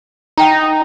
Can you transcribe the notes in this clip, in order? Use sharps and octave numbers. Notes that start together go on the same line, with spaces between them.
D#4 F#5 G5 A#5